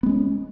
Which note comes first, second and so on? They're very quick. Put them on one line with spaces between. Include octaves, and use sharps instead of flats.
B3 G#3 C#4